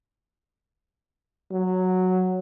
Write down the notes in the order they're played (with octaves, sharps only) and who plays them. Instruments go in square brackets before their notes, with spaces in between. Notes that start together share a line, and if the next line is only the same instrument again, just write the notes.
[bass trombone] F#3